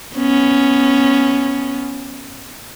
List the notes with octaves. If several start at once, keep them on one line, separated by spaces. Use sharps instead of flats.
B3 C#4